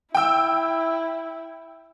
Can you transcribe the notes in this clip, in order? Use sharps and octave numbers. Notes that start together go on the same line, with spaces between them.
E4 G5 E6